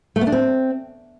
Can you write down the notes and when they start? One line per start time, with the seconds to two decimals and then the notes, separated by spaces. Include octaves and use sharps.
0.16 A3
0.21 B3
0.27 D4
0.32 C4